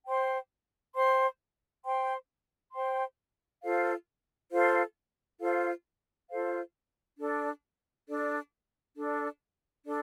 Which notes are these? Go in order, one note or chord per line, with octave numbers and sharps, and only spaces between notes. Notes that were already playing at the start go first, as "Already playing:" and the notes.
C5 G5 C6
C5 G5 C6
C5 G5 C6
C5 G5 C6
F4 A4 C5 F5
F4 A4 C5 F5
F4 A4 C5 F5
F4 A4 C5 F5
D4 A4 D5
D4 A4 D5
D4 A4 D5
D4 A4 D5